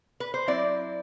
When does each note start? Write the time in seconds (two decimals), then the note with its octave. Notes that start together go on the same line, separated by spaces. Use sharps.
0.20 B4
0.34 C5
0.48 F#3 C4 E4 D5